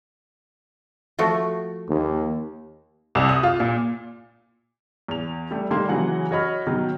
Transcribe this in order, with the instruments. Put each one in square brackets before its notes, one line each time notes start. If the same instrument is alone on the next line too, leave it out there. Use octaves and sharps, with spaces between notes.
[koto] F3 A3 F#4
[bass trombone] D#2
[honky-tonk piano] C2
D#6
F4
A#2
[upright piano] E2 F7
G3 A3 G4
D#3 G3 A3 A#3 C6
C#3 E3 F#3 F#5 G#5
F#4 C#5 D#5 B5 F6
B2 D#3 F#3